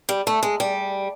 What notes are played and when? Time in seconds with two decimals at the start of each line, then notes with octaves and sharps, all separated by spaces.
0.09 G3
0.27 A3
0.43 G#3
0.60 G3